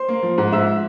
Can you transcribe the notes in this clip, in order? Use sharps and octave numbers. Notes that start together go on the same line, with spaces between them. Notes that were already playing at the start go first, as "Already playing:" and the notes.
Already playing: C5 C6
A#3
F3
G#2
G#2 E5 E6